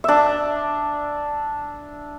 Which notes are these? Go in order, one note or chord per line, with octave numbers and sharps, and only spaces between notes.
D4 E5